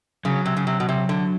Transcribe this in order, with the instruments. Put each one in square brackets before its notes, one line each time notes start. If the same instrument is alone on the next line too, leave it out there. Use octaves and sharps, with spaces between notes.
[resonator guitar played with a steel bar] C#3 [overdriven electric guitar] F#3
[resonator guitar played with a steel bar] C3
C#3
C3
B2
C3
D3